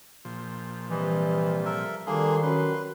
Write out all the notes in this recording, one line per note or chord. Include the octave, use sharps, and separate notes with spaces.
A#2 F3
C3 E3 G3 D#5
A4 A#4 E5
D#3 F3 G3 A#3 D4 G#4 A4 C6
F#3 C#4 A#4 B4